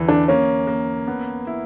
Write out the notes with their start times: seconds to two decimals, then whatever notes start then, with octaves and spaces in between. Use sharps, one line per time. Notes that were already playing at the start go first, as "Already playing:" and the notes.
Already playing: E2 D3 E3
0.08 D4
0.28 A#3 C#4
0.67 A#3
1.07 B3
1.47 E4